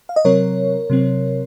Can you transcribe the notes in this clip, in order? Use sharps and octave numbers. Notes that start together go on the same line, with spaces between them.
F5
D#5
C3 F#3 C4 A#4 C#5
C3 F#3 C4